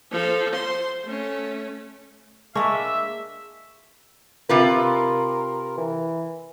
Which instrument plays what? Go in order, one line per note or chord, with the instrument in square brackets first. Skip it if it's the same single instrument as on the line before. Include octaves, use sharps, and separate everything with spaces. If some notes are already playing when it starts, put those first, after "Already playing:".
[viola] F3 A4
C5 C6
A3 C#4
[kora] G#3 A#3 D4 [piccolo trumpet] E5 [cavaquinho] C#6 D#6
[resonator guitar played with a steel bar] C3 F4 B4 [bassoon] A#4
[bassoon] E3